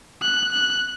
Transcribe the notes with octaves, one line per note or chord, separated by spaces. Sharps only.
F#6
F#6